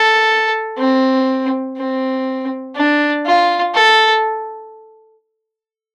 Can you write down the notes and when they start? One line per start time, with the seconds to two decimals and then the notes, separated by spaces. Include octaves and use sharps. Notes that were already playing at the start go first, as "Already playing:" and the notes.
Already playing: A4
0.78 C4
1.77 C4
2.75 D4
3.26 F4
3.74 A4